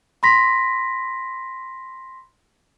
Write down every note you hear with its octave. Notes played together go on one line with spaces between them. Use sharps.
B5 C6 A#6 B6